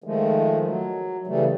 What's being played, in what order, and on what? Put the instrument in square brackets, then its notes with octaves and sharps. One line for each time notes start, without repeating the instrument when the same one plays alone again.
[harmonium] D#3 F3 G#3 A3
F#3
C#3 E3 G3 A3